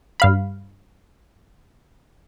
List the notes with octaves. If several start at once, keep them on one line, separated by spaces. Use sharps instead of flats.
G2 F5 B5